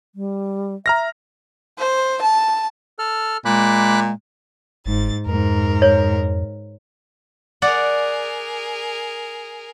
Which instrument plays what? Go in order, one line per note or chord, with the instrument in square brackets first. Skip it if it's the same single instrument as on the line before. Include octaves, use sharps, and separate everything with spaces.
[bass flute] G3
[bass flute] E5 [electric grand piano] A#5 F6 A#6
[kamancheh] C5
A5
[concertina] A4 F6
[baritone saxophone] A#2 [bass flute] G#3 [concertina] B5 D6 F#6
[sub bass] G1 [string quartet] G#2 A6
[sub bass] F2 [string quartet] G#2 A#4
[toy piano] C#5
[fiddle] G#4 A#4 [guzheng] D5 F#5